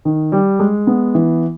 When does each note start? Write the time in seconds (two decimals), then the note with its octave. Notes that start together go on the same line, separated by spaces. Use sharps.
0.05 D#3
0.32 G3
0.60 G#3
0.87 B3
1.15 E3